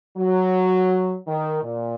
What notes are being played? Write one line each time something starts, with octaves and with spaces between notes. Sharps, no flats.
F#3
D#3
A#2